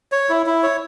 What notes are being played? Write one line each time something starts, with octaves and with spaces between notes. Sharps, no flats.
C#5
E4
E4
C#5